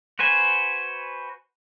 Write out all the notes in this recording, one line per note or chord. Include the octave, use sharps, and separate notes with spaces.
F#4 B4 C5 G#5